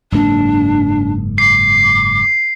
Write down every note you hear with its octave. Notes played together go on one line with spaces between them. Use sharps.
F#1 G#2 A#3 D4
D6 C7